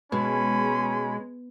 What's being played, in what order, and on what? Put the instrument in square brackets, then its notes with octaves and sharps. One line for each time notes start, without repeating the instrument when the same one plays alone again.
[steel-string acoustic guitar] B2 [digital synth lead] G#3 [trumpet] C#4 [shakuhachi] B5